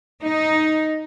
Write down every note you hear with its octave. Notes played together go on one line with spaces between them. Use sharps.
D#4